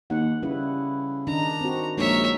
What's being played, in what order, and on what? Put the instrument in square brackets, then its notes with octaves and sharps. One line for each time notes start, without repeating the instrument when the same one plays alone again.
[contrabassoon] D#2 [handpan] F#5
[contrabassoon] C#3 [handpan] G3 E4 B4
[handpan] D#3 D4 D#4 [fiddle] A#5
[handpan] C4 F#4
[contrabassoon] A#1 [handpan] G#3 D#4 A#4 [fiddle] C#5 E5